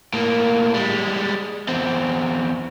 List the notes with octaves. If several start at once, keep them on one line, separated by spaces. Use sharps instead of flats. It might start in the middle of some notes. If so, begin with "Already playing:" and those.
A2 A#3
G3 G#3
E2 C4